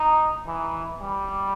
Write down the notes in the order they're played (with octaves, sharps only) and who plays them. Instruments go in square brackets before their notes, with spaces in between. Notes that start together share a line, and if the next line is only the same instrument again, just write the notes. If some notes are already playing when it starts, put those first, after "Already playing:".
Already playing: [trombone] D#4
E3
G3